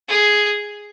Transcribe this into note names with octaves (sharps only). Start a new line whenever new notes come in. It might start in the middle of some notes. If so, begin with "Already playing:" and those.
G#4